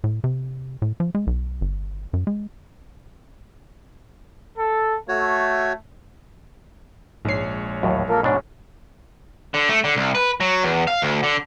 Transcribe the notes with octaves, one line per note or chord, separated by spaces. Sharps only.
A2
C3
A2
F3
G#3
B1
G1
F#2
G#3
A4
A3 F#4 C#5
A#1 G#2 G#3 C#5 C7
D#2 A2 F#3
A#3 F4 A4 A#4
G#2 B2 C#4 D4
D3
A3
D3
C2
B4
F#3
E2
F5
D2
D3